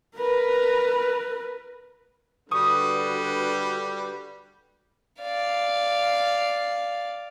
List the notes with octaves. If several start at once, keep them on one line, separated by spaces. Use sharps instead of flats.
A#4 B4
D3 G3 F#4 B4 C#6 D#6
D5 F5